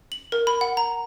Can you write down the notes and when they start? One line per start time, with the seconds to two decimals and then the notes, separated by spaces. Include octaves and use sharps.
0.12 F#7
0.32 A#4
0.47 B5
0.61 F#5
0.77 A#5